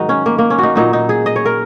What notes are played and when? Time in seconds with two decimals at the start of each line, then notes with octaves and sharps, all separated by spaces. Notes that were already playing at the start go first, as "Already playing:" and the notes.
Already playing: G#2 D#3 F#3 D#4 F#4
0.09 C#4
0.26 A#3
0.38 A#3
0.50 C#4
0.58 D#4 F#4
0.76 A#2 F#3 D#4
0.93 D#4
1.09 G#4
1.26 D#5
1.36 C#5
1.46 A#4